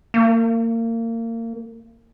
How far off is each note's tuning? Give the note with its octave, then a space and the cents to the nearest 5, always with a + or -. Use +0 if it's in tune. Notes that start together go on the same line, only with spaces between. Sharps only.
A#3 -30